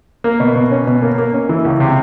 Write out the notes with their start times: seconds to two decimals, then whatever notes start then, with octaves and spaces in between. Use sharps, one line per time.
0.24 A#3
0.40 B2
0.55 B2
0.71 C#4
0.87 B2
1.02 A#3
1.18 A#3
1.33 C#4
1.49 E3
1.65 C#2
1.80 C3